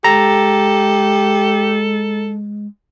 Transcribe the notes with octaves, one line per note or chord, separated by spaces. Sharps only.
G#3 G4 A4 A#5